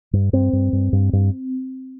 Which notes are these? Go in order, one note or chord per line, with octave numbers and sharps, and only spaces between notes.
G2
G2 C4
G2
G2
G2
G2